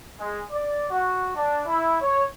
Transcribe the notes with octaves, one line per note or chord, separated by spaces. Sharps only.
G#3
D5
F#4
D4
E4
C#5